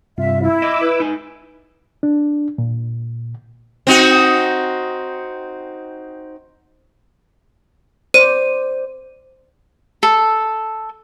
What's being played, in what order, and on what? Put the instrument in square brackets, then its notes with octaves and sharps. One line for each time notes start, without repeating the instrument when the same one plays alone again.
[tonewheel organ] G2 C3 F4 [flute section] E5
[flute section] E4
[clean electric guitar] D#5 B5 [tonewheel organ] D6 E6
[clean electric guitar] B4
D#4 G#5
[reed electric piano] D4
A#2
[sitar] C4 D#4 F#4
[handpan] C5 D5 [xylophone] D#7
[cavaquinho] A4